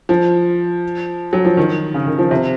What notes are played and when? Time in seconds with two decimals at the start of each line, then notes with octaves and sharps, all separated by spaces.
0.09 F3
1.33 F#3
1.45 F3
1.57 D#3
1.94 C#3
2.07 D#3
2.19 F3
2.31 C3